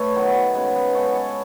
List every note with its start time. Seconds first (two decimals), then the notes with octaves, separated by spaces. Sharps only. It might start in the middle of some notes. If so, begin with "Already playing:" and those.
Already playing: A3 A4 B4 C#5
0.15 D#3 F#3 B3
0.55 C#3 G#3 B3
0.76 G#4 B4
0.95 C#3 G#3 B3 A4 C#5
1.15 A4 C#5